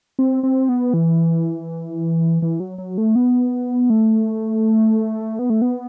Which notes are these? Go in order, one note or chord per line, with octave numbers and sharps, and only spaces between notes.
C4
C4
B3
E3
E3
F#3
F#3
A3
B3
A3
B3
A3
B3